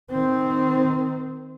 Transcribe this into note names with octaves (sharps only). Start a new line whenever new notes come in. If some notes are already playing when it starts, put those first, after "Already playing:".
D#3 C4